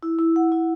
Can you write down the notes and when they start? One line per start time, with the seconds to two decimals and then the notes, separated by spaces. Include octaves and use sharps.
0.03 E4
0.19 E4
0.36 F#5
0.52 E4